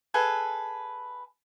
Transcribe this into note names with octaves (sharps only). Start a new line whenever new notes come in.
G#4 A4 B4 F5